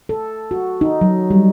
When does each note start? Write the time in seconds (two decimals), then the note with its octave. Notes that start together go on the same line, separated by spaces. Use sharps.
0.09 A4
0.51 F#4
0.81 D#4
1.01 F#3
1.30 G3